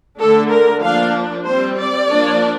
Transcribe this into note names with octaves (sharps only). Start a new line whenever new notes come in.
D3 A3 D4 A4
A#4
F3 A#3 D4 F5
G3 C4 C5
D5
F3 A#3 D4